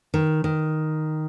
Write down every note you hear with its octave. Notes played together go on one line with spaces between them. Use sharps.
D#3
D#3